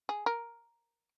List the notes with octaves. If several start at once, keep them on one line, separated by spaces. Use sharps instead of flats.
G#4
A#4